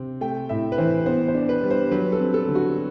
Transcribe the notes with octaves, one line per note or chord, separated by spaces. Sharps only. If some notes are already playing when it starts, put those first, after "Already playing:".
Already playing: C3 C4
A3 G5
A2 E5
B4
E3 C5
B3 C5
C5
D4
B4
G3
C5
F#3 B4
A4
C4
A4
D3
F#4